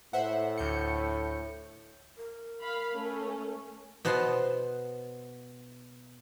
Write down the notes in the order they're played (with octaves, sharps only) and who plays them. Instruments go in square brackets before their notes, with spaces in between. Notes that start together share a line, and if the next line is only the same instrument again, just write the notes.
[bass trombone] A2 [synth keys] C5 E5 F#5
[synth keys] D2 G6 C#7
[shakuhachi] A#4
[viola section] F5 B5
A3 C#4
[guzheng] B2 B3 C5 F#5 A5 C6